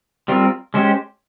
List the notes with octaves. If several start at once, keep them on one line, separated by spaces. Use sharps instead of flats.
G3 C4 F4 A#4
G#3 C#4 G4 C5